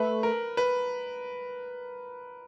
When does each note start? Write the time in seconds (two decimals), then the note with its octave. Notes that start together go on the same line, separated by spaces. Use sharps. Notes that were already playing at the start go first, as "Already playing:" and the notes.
Already playing: A3 B4
0.23 A#4
0.57 B4